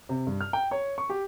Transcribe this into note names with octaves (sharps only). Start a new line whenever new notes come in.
C3
G2
F6
G5
C#5
C#6
G4